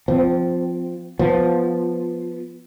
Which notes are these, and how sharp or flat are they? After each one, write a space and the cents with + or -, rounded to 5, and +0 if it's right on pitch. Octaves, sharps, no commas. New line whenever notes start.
F3 +0 C4 -20
F3 +0 B3 +0